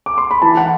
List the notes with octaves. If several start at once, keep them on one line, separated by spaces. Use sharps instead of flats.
D6
C6
B5
E3 A5
F#5